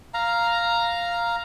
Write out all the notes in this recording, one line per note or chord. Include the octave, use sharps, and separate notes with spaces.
F5 A#5